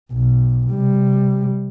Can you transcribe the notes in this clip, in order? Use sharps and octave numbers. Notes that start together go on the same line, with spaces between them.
B1
C3 G3